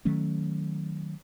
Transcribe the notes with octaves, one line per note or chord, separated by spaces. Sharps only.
D#3 F#3 A3 C#4